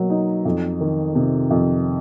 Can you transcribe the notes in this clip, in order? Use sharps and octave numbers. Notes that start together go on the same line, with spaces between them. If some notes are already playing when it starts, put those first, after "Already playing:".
Already playing: B2 F#3 A#3
D#4
F2
D#3
C3
F2